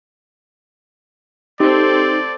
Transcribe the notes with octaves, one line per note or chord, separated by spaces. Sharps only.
C4 D#4 G4 A4 D5